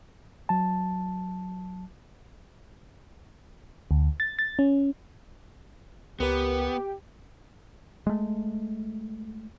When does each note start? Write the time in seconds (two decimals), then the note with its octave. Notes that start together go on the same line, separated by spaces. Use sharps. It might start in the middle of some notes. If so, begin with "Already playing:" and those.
0.49 F#3 A5
3.91 D2
4.20 A6
4.39 A6
4.59 C#4
6.20 C#2 B3 G4 A#4 B4
8.07 G#3 A3